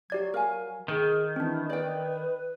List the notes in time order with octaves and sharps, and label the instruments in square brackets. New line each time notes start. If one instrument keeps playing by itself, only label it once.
[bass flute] F#3 [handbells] G4 D5 G#6
[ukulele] A#4 F5 G#5
[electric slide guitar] D#3 [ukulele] D#4 [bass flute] G#4
[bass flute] E3 [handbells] C4 D4
[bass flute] B4 [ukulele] D5 G5